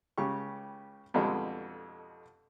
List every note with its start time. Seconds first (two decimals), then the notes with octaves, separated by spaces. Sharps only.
0.18 C#2 C#3 G4 C#6
1.14 F2 B2 D3 G3 G#3